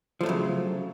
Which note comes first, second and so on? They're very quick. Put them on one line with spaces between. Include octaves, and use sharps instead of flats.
F3 A3 F#3 C#3